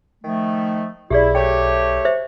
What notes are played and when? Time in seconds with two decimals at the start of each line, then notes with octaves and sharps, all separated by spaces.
0.24 D#3 F3 A3
1.10 B1 E4 G4 G#4 D5
1.35 A3 G4 C#5 G5
2.05 C5 E5